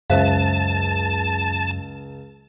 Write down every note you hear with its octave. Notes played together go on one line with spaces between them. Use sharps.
C#2 F#2 C5 E5 F5 A5